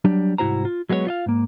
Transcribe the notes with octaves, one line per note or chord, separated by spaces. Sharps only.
F#3 G3 D4
C2 G#2 E4 F#4 C5 A#5
F4
F#3 G#3 B3 F#4 C#5
F4 D#5 F5
G#2 A#3